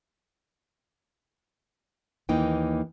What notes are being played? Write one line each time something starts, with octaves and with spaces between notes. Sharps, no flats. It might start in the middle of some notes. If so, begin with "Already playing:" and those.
D#2 E3 A#3 D#4 G5